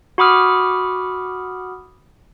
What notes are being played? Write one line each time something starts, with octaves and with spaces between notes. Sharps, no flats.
F#4 F#5 B5 D6 D#6 F6